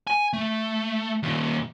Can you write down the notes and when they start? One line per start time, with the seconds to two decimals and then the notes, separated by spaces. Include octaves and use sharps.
0.07 G#5
0.33 A3
1.23 D#2 A#2